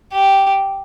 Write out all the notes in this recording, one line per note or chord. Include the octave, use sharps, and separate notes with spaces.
G4